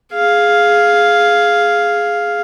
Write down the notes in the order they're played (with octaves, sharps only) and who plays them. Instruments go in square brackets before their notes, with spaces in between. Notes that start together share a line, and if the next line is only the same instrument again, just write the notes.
[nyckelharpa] G#4 F5